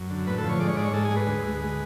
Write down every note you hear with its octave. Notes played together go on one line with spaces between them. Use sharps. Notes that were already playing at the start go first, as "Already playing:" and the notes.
Already playing: F#2
D3
A2 B4
A4
F3
C#5
G#3 D5
C#5
G#2 D5
C#5
G#3 A4
G#4
G#3
B4
D2
G#3
G#3